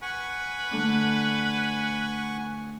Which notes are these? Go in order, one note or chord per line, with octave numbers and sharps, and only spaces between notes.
B4 F#5 G#5 C#6
D3 A3 D4